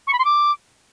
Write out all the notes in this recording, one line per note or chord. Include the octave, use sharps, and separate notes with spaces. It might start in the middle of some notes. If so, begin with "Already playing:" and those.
C#6
B5
C6
D6